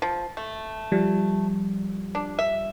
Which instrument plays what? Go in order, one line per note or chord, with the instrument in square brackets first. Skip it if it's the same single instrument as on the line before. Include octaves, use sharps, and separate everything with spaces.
[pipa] F3
A3
[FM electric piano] F3 G3
[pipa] D4
E5